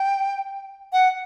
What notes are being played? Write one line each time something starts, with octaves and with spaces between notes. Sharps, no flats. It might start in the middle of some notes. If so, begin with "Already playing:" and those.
Already playing: G5
F#5